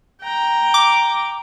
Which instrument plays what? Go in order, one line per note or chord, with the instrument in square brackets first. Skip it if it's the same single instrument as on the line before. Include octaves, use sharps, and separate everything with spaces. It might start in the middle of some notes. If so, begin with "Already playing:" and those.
[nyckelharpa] G5 A#5
[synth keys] D6